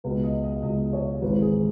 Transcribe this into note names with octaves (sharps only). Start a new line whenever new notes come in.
C#2 B2 B4
D#5
D#5
C#2 B2 D#5
C#5
G#1 G#2 E3 B4
G#4